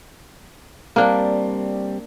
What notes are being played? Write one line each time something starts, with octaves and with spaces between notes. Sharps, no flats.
G3 A#3 C4 D4